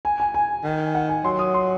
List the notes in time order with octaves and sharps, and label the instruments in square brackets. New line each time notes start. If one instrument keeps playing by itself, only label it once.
[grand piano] G#5
G#5
G#5
[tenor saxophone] D#3
[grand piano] F#5
G#5
[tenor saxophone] F#3 [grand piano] C6
[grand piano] D#6
C6